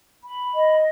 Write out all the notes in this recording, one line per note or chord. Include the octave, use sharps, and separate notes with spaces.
B5
D#5